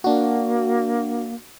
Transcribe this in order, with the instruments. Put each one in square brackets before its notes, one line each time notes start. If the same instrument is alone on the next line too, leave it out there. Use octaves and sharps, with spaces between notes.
[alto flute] A#3 [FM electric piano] D4 F#4